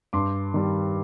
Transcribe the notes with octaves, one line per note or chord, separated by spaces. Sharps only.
G2 C6 D6
D#3 G3